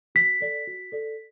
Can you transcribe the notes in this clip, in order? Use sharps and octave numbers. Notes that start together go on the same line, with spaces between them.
F#4 B6
A4 D5
F#4
A4 D5